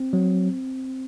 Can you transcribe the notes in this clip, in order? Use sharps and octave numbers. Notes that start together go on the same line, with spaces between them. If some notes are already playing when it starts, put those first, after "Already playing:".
Already playing: C4
F#3